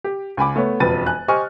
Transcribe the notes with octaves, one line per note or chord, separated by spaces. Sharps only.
G4
C#2 G#5 B5 D6
A3 B3 C#5
E1 F2 B4 A6 D#7
G#5 F#6
G4 C5 D#5 G#5 C#6 F6